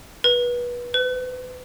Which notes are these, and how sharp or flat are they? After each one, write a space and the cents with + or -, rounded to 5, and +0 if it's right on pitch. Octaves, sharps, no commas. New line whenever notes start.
B4 -25
B4 +35